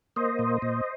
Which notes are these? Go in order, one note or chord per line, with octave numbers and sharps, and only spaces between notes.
A#3 C5 D#5
A#2
A#2